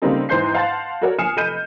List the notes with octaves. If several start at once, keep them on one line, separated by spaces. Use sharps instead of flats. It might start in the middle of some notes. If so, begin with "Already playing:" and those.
C#3 G3 A#3 C4 D#4 A4
E2 G#2 C5 C6 G6 C7
F5 F#5 A5 C6 A6
F#4 A4 A#4 C#5 D5 F#5
G#5 D#6 F6 C7 C#7 E7
F1 A4 D#5 B5 G6 D#7